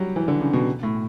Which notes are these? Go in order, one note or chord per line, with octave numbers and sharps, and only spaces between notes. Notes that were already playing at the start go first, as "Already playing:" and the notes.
Already playing: F#3 G3
E3
D3
C#3
B2
A2